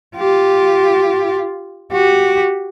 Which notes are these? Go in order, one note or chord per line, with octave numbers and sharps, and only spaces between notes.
F4 G4
F#4 G4